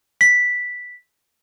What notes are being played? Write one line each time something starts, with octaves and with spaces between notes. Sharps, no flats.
B6